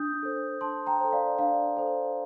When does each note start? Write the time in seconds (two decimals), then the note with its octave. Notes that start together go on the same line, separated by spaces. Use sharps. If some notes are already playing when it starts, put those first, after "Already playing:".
Already playing: D4 D#6 G6
0.23 A4 C5
0.61 D4 A5 C6
0.86 G5 A#5
1.01 A4 C5
1.12 D5 F5
1.38 D4 D5 F5
1.77 A4 C5